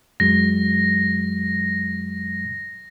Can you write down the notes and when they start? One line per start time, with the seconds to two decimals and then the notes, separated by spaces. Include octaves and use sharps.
0.20 F#2 F#3 G#3 A#6